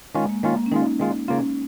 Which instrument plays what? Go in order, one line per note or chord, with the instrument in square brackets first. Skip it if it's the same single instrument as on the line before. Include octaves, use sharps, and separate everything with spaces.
[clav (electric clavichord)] D#3 C#4 F4 [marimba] G#3
[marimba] A#3
[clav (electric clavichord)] D#3 C#4 F4 [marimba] A#3
[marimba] A#3
C#4
[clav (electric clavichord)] D#3 G#3 F4 [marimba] D#4
[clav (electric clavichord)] D#3 G#3 F4
[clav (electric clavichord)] C#3 A#3 F4 [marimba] C#4